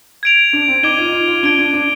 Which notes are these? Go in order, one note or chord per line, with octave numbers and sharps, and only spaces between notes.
G#6 D7 F7
D4
C4
D#4 D6 G#6 D#7 G7
F4
D#4
F4
F4
D4 G#6 D7 G7
D4
D4